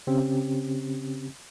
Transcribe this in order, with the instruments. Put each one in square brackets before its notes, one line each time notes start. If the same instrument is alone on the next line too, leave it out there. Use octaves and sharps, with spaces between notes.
[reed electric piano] C#3 C4 C#4 G4